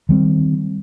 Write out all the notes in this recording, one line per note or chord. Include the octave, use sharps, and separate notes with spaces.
D#3 G3 C4